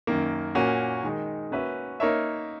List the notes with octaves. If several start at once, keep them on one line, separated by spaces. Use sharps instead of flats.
F#2 D#3 A#3
A#2 A#3 C#4 F#4
D#3 G#3 D#4
A#3 C#4 F#4 B4 E5
A#3 D#4 A#4 C#5 E5